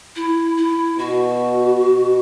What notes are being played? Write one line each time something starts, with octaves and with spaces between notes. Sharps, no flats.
E4
E4
B2 F#4
B2